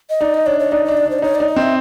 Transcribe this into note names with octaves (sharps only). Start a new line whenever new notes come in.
D#5
D#4 D5
D#5
D4 C#5
C#5
D#4 D5
D4 D#5
D5
D4 C5
D5
D#4 C#5
D#4 D5
D#5
C4
E5